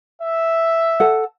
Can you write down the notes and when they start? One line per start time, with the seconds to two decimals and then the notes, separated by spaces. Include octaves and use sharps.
0.22 E5
1.00 A4 F#5